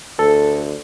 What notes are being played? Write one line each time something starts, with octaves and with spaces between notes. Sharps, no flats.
D2 A4